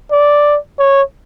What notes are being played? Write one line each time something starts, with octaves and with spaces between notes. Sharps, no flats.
D5
C#5